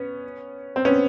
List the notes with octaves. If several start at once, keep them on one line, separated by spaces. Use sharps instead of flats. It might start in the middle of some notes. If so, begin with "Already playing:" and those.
Already playing: B3 C#4
C4
B3 C#4